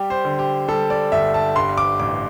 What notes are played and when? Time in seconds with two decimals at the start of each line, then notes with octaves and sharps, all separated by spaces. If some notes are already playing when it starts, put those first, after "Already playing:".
Already playing: G3 G4
0.10 C5
0.25 D3
0.39 G4
0.68 G3 A4
0.90 D5
1.12 G1 E5
1.34 A5
1.55 G2 C6
1.78 D6
1.99 A1 D6